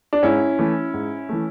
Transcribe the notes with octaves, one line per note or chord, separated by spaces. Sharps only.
D4
G#2 C#4 E4
E3 A3
G#2
E3 A3